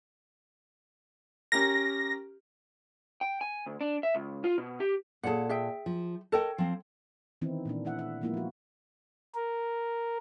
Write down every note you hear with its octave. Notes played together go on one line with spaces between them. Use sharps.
C#4 G4 A#4 A#6
G5
G#5
D2
D4
E5
C#2
F4
B2
G4
A#2 G#4 A4 C#5 F#5
G#4 E5 G5
F3
A4 A#4 C#5 D#5 G5 A5
F3 C4
D#3 E3 B3 C4 D#4 E4
A#2 A#3 D4
A3 E4 E5 F#5
E5
F3 G#3 A#3 B3 E4 F4
F3 F#4
A#4